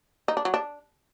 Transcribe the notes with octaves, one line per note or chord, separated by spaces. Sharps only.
D#4
D4
F#3
D4